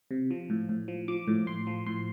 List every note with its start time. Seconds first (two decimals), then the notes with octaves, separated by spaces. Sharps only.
0.11 C3
0.31 F3
0.50 A2
0.69 A2
0.88 F3
1.08 F3 D6
1.28 A2
1.47 A2 C6
1.67 F3
1.86 A2 C6